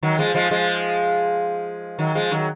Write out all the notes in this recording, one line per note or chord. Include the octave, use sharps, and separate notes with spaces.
D#3 F#3
F3 G#3
F3 G#3
F3 G#3
D#3 F#3
F3 G#3
D#3 F#3